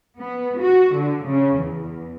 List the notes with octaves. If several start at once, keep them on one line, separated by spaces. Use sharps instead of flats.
B3
F#4
D3
C#3
E2